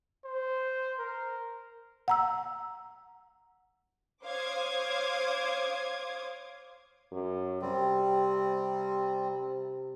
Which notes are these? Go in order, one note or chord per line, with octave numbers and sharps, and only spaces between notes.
C5
A#4
F#5 A#5 E6
C5 C#5 F5 D6 D#6 G#6
F#2
C3 G3 C4